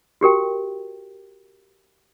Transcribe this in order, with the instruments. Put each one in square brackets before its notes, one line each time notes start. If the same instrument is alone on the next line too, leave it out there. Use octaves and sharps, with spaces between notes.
[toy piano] F#4 G4 A#4 G5